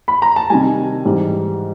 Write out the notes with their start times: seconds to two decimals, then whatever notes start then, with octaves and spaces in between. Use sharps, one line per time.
0.08 B5
0.22 A#5
0.36 A5
0.50 C3 D#3 G3 G#5
1.05 G#2 E3 G3